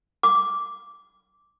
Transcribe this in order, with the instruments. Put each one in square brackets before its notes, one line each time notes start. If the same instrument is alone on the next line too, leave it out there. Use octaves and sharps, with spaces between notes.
[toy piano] D6